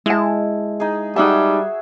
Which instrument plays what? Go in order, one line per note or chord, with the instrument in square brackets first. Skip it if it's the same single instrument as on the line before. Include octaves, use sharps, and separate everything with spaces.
[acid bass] G#3 [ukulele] E4 A5
[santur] D#4 G#4
[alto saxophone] G3 [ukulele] D#4 A5 [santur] F#4 G#4 E5